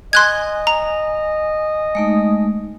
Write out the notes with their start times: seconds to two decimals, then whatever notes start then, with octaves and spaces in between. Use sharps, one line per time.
0.13 D#5 G#5 C6 F#6 G#6
0.67 A#5
1.95 G#3 A3 D#4